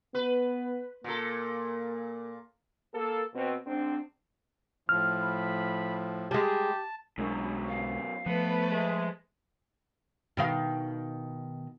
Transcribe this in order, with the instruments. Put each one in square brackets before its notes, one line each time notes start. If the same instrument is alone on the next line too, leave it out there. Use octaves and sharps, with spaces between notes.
[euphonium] B3 [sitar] B4
[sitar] A#2 A4 [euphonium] A#3
[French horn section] A#3 A4
B2 C4
G#2 C4 D4
[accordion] A2 F3 [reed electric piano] F6
[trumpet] B5
[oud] G3 G#3 [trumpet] G4 [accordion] A5
[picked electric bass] B1 G#3 D4 [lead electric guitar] F#2 B2
[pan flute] F5
[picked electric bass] F3 [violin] A3 B4 [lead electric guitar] B3
[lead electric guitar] G#3 [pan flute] E5
[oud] B2 D#3 F5